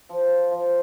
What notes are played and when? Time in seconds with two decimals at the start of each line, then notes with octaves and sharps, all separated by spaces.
0.09 F3
0.51 F3